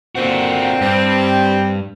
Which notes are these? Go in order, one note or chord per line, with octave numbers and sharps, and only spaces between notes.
A#2 D3 A#3 C4 F#4
G2 G3 C4